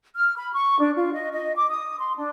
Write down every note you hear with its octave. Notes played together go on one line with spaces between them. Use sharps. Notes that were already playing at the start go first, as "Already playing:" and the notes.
F6
B5
C#6
D4
F4
D#5
D#5
D6
D#6
C6
D4